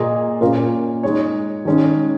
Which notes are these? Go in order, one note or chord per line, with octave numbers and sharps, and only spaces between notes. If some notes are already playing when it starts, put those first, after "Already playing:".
Already playing: A#2 A#3 F4 G#4 D#5
A#2 A#3 C#4 F4 A#4
G#3 D#4 C#5
D#3 G#3 C#4